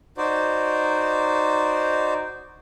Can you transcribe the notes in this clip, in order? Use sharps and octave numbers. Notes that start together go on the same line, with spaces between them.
D#4 F#4 C5 D5